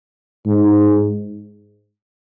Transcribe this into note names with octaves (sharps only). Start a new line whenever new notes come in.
G#2